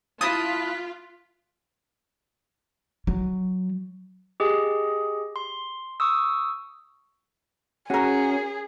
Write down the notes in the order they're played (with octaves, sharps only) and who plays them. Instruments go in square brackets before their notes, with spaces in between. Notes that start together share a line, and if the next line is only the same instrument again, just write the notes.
[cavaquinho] E4 D#5 A5 [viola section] F4 [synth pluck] D#6 [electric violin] F#6 B6
[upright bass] F#3
[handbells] G4 G#4 D#5
C6
C#6 D#6 E6
[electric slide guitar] C#4 [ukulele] F#4 A#4 [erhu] G#4